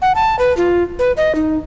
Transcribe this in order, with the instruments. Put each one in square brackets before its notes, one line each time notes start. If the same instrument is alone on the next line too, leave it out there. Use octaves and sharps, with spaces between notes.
[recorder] F#5
A5
B4
F4
B4
D#5
D#4